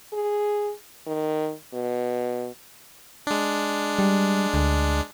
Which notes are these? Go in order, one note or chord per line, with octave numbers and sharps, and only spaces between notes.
G#4
D#3
B2
G#3 D4
G3
D2